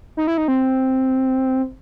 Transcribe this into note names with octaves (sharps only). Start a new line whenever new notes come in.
D#4
E4
D#4
C4